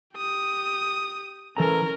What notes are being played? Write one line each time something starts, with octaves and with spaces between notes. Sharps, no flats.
G4 D#6
E3 C#4 A4 A#4 A#5